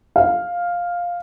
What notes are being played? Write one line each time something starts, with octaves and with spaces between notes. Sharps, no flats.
F5